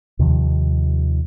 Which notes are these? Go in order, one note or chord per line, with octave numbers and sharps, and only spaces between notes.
D#2 C3 D#3 F3